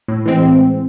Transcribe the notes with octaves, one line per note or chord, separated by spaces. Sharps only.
A2
E3 G#3 C4